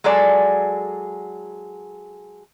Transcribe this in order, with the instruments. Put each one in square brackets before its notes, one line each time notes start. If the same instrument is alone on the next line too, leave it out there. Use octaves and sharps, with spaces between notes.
[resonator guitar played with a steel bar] F#3 G#3 G#4 A4 D5